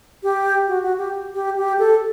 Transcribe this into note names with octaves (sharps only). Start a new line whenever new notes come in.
G4
F#4
F#4
G4
G4
G4
A4